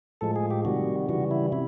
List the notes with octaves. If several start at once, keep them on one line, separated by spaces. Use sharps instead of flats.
A2 F3 G#3 A4
G#4
G4
C3 D#3 G3 F#4
C#3 E3 G3 F#4
E4
C3 E4